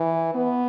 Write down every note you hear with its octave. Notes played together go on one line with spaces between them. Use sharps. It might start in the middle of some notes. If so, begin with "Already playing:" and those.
Already playing: E3
B3